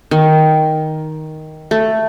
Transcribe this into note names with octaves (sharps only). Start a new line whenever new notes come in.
D#3
A3